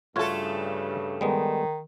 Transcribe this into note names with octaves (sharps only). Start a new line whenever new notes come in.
G2 C#3 A3 F4 F#4 A4 C#5
D#3 G3 G#3 B3